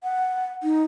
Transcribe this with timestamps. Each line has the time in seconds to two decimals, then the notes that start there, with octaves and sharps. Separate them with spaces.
0.04 F#5
0.63 D#4